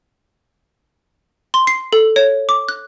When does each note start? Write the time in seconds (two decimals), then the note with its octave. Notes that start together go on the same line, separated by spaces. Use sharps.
1.54 C6
1.67 C7
1.93 A4
2.16 C#5
2.49 D6
2.69 F#6